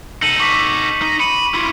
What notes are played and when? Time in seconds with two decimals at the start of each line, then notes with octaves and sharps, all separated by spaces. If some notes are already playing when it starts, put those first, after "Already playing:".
0.22 D#4 A4 C#7 D#7 F#7
0.40 C#6 D6 B6
1.02 D#4
1.20 B5 C#7 D#7 F#7
1.54 E4 F4